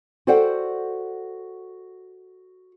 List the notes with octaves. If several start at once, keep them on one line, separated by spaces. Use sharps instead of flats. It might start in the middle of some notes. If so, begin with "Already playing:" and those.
F#4 A4 C5 D5 F#5 G5